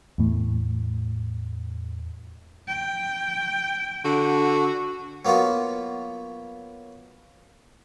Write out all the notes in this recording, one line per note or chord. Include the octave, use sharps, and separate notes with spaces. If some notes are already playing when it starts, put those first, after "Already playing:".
E2 A2
G5
D3 F#4
F#3 A#3 B3 F4 F#4